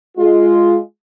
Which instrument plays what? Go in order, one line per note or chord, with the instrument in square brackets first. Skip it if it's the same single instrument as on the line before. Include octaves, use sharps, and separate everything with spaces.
[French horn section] G#3 F4